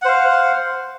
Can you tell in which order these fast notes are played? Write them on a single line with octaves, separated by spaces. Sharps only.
F#5 C5 F5